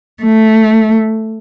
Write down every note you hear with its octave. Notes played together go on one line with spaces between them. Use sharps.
A3